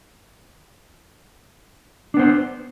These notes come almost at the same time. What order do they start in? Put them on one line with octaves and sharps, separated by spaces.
D4 B3 C5